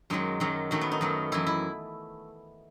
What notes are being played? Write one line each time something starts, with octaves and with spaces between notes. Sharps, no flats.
F#2 D#3 F#3 G#3
F#2 D#3 F#3
F#2 D#3 F#3 A3
B3
D#4
F#2 D#3 F#3
F#2 E3 E4
E4